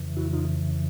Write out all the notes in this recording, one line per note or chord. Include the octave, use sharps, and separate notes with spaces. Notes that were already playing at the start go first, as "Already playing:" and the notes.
Already playing: F2 C#3 E3
E4 F#4
D#4 F4